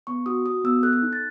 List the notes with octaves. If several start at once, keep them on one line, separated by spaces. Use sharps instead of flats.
B3 C#6
F#4 D#6
F#4 D#6
B3 E6
A4 F#6
F#6
D#4
A6